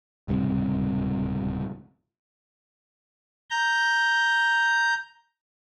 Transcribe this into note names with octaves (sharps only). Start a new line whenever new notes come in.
D1 C#2 G2 C3
A#5 G6